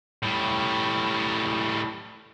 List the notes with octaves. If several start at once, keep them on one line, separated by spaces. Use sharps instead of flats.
A2 G3